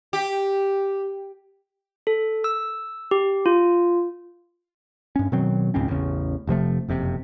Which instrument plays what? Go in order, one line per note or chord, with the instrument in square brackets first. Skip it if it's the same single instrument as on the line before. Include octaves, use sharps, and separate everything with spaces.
[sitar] G4
[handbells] A4
E6
G4
F4
[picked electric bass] G2 C#4
B2 D#3 F#3 C4
C#2 G#2 C4 C#4
A1 E2 C#3
F1 C3 F3 A3
F#1 F2 C3